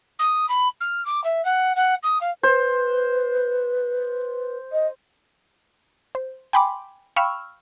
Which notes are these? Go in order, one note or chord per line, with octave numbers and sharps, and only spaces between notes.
D#6
B5
F6
D6
E5
F#5
F#5
D#6
F5
B4 C5
D#5
C5
G5 G#5 B5 C6 D6
F5 G5 B5 C#6 E6 F6